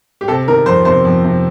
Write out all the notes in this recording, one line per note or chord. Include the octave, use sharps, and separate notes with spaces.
G4
C3 A4
D#3 A#4
F2 C5
C3 C5
F2
C3